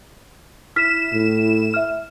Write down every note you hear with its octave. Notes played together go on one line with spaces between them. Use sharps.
E4 F6 B6 E7
A2
E5 F6